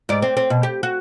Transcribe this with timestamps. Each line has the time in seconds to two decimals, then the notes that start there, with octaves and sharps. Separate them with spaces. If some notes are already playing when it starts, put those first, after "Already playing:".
0.09 G#2 D5
0.22 C4
0.37 C4
0.50 B2
0.63 G4
0.83 F#4